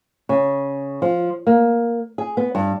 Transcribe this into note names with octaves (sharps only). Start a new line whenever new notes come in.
C#3
F3
A#3
G#4
B3
G2